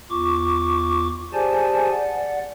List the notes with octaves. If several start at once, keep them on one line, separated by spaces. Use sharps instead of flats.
E2 F4 C#6 D6
G4 G#4 C5 D5 G#5 A5
D5 F#5